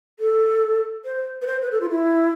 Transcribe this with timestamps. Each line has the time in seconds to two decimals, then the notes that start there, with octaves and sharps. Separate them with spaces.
0.19 A4
1.05 C5
1.42 B4
1.47 C5
1.62 B4
1.72 A4
1.81 F4
1.90 E4